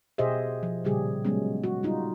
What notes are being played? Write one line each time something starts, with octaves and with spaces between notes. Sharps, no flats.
B2 G4 G#4 C5 D#5 E5
F3
A#2 C#3 G3 G4 G#4
F#3 G#3 B3 C#4
F#4
G3 D#4 F4